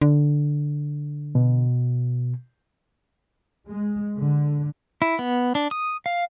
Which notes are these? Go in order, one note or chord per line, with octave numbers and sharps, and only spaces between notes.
D3
B2
G#3
D3
E4
B3
D4
D#6
F5